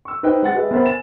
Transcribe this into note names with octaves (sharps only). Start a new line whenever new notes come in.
C#6 E6
D#4 B4 C5 D#5 G5
G#3 F#5 A6
G4 G#4 B4 D#5 E5
B3 A#4 C5 E5 G5 B5
G#5 A6 E7